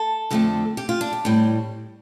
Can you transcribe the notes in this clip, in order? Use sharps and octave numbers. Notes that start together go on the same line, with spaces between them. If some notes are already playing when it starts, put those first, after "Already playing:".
Already playing: A4
F2 D3 A3 C4
G4
F4
D4
G4
A2 G3 C4